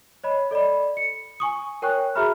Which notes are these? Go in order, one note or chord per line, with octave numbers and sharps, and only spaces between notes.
C#5 D#5 B5
A4 D5 D#5 B5
C#7
G#5 C#6 D#6
A#4 C#5 G5 G#5 C#6 F#6
F#4 G#4 E5 A#5 B5 F6